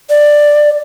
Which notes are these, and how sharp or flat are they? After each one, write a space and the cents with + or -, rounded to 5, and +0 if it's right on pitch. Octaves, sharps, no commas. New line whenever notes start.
D5 +10